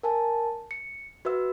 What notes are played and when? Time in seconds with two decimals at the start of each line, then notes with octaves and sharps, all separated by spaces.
0.03 A#4 G#5 A5
0.71 C#7
1.25 F#4 B4 E5 E6